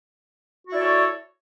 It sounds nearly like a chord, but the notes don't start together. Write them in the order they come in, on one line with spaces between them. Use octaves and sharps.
F#4 E4 D5 A4 C#5